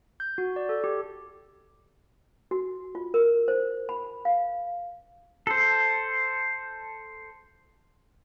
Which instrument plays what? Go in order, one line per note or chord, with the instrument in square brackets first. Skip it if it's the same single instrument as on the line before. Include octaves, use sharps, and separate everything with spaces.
[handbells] G6
F#4
D5
A4
G4
[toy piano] F#4
F4
A#4
C5
B5
F5
[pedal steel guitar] A4 C5